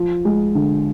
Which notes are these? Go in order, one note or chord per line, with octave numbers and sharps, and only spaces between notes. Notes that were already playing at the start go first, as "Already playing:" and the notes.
Already playing: F3
G#3
D3